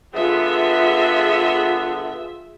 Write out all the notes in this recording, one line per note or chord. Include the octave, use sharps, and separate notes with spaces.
D3 B3 F4 G#4 E5